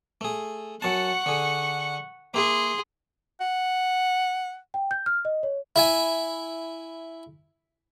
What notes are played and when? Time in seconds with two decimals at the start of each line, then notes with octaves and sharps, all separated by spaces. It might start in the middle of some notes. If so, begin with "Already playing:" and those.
0.21 A3 G#4
0.82 F#2 F#5 A5 C#6
1.26 D3 G#4
2.34 A#3 E4 G#4 C6
3.40 F#5
4.74 G5
4.91 G6
5.06 F6
5.25 D#5
5.43 C#5
5.76 E4 E5 G#5